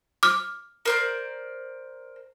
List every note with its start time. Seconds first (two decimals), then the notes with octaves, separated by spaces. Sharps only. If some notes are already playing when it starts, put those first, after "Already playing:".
0.23 D6 F6
0.85 A#4 C5 D5